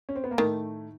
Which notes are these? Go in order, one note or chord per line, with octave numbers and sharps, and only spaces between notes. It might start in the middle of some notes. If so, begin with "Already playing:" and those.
C#4
C4
B3
A#3
A2 D#3 A3